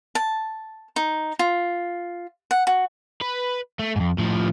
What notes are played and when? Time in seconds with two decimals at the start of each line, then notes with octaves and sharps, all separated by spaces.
0.15 A5
0.96 D#4
1.39 F4
2.51 F#5
2.67 F#4
3.21 B4
3.79 A3
3.96 F2 G#2
4.18 A2 F3